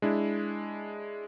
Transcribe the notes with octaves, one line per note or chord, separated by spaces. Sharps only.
G#3 D4 E4